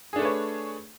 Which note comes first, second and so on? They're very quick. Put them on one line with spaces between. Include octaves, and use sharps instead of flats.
G#4 D4 A3 B4 C#5